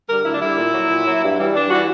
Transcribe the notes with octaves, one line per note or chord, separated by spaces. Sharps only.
D3 G3 A#4
D2 E4
D4
D3 G3 E4
A#2
F#3
A#2
F#3
G2
E3 G3
G2 D4
E3 G3 F#4